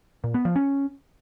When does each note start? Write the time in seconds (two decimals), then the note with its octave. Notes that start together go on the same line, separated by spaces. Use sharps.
0.24 A#2
0.34 B3
0.45 F3
0.56 C#4